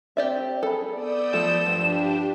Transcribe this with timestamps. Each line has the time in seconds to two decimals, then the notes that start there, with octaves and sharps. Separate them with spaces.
0.17 C4 G4 D5 E5
0.63 G#4 A4 B5
0.94 B3 D5 D#6 E6 G6
1.33 F3 A3 A4 E7
1.66 G2 F3 D4 G4